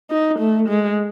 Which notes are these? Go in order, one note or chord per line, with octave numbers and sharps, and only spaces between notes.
D#4
A3
G#3